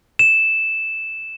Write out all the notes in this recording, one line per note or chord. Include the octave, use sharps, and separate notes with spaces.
E7